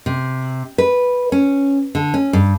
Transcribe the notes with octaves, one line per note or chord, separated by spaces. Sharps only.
C3
B4
C#4
D3
C#4
G2